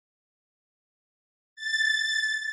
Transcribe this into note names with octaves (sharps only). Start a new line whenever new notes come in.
A6